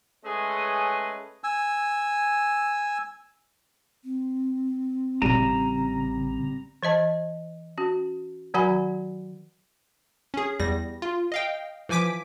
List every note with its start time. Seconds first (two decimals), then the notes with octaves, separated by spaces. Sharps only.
0.25 G#3 A3 C#4 G#4 B4 D#5
1.44 G#5 E6
4.04 C4
5.22 A1 C#3 G3 A#5 D#7 E7
6.83 E3 C5 D#5 A5
7.78 C#4 F#4
8.54 D#3 F#3 F#4 F#5 G#5 B5
10.34 C#4 G#4
10.60 E2 G3 A#6
11.02 F4
11.32 D#5 F5 G5
11.89 E3 F3 G#5 D6 B6 D7